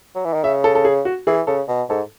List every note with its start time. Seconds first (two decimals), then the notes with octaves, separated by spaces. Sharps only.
0.15 F#3
0.25 E3
0.34 D#3
0.44 C#3 E5
0.64 A4
0.75 A4
0.85 G#4
1.05 F#4
1.27 E3 G#4
1.47 C#3 A4
1.68 B2
1.89 G#2 A4